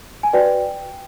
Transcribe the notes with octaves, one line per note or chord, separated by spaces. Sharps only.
G#5
F#4 B4 D5 G5